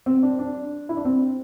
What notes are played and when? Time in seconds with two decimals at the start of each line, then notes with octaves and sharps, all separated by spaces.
0.06 C4
0.23 D4
0.39 D4
0.89 E4
0.97 D4
1.05 C4